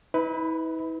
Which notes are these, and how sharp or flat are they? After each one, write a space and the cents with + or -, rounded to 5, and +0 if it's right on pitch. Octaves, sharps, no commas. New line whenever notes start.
E4 -40 B4 +10